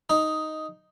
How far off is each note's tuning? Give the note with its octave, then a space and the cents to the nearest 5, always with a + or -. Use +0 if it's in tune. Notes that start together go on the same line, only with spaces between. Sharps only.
D#4 +5